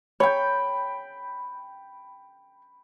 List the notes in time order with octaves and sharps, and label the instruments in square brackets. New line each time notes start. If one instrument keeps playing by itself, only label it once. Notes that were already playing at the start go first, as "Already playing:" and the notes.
[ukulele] C#5 [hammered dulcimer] G5 B5